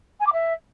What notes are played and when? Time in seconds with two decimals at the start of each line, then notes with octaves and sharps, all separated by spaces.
0.20 G#5
0.26 D6
0.33 E5